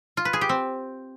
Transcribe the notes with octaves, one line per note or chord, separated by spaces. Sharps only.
F4
B4
G#4
G4
C4